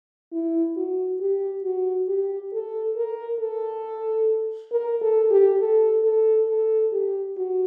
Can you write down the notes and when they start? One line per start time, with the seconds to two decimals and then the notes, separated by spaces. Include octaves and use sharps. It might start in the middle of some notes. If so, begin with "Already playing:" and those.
0.33 E4
0.76 F#4
1.20 G4
1.64 F#4
2.08 G4
2.53 A4
2.97 A#4
3.40 A4
4.72 A#4
5.02 A4
5.31 G4
5.60 A4
6.04 A4
6.48 A4
6.92 G4
7.36 F#4